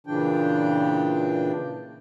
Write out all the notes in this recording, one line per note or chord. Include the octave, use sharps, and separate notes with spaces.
A#2 C#3 E3 D4 G5